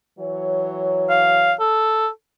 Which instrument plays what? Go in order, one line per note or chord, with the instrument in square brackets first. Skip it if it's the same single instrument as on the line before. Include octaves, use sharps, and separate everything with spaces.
[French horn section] E3 F#3 C#5
[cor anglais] F5
A4